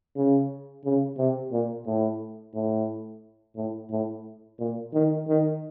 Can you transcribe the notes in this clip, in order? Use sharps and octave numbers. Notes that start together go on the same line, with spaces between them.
C#3
C#3
C3
A#2
A2
A2
A2
A2
A#2
D#3
D#3